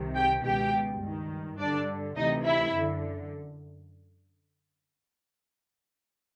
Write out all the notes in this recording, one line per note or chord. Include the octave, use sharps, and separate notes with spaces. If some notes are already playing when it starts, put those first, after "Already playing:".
Already playing: C2 C3 D#3
G4 G5
C#2 B2 G4 G5
G2 D#3
G2 D3 D4 D5
D2 C3 E3 D#4 D#5
E4 E5
F#2 D3